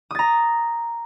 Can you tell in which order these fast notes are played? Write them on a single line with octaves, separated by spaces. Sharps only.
D#6 A6 A#5